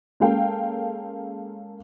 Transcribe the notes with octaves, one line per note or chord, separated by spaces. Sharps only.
G#3 A#3 C#4 A4 F5 G5